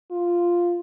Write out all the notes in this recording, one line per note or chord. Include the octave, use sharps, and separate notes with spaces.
F4